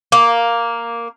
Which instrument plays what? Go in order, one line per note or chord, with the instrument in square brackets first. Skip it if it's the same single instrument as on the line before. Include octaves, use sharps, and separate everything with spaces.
[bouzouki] A#3